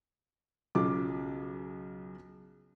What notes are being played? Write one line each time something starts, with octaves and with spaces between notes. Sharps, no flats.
B1 C#3 F4 D6